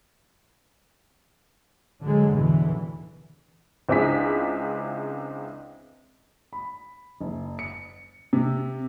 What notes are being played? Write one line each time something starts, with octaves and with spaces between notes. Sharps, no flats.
D3 F#3 G#3
E2 B2 D3 E3
C#2 C4 D4 E4 G#4 B6
B5
F#1
C#7
C3